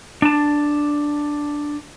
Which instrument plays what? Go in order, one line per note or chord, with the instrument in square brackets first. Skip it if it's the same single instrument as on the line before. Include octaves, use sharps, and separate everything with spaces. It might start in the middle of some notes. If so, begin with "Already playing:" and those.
[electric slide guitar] D4 A5